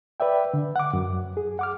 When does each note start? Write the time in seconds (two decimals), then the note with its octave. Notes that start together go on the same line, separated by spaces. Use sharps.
0.20 B4 D5 E5 G5
0.54 D3
0.76 F#5 D6
0.93 F#2
1.37 G#4
1.59 F#5 D6 F6